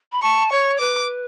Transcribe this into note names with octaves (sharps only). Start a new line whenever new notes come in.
B5
A5 C#6
C#5 C#6
B4 D6